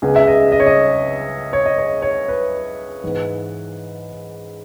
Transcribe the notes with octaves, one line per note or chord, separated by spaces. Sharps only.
C#2 C#3 G#3 B3 G#4
E5
D#5
D#5
C#5
D#5
C#5
D#5
C#5
C#5
B4
G#2 E3 B3